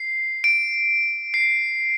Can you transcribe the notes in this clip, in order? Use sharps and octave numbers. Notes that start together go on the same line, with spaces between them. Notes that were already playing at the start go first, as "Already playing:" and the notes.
Already playing: C7
D7
C7